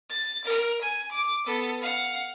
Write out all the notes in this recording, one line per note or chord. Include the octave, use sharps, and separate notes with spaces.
A6
A#4
G#5
D6
B3 A4
F5 F#5